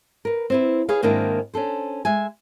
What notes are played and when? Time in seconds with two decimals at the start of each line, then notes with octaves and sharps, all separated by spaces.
0.25 A#4 B4
0.50 C4 E4 B4
0.89 G#4 B4 C#5 F5
1.03 G#2 D#3 A#3 C4 D4 E4
1.54 C#4 D4 A4 C5
2.05 G#3 E5 G#5